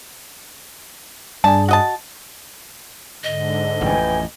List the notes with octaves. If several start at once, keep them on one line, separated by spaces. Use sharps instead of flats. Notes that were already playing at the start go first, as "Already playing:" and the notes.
G2 D4 G#4 A5
F#4 D#5 A5
G#2 D3 D#5
A1 F2 B4 G5 G#5